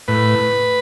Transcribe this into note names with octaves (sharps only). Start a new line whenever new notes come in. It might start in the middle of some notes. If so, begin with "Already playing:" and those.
A2 B4